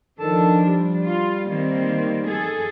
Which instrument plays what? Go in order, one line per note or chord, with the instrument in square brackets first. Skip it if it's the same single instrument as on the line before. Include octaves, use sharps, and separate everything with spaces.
[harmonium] D#3 A4 A5 [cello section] F3 D4
[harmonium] G3
[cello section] F4
D#3 A#3 C4
G#4 A4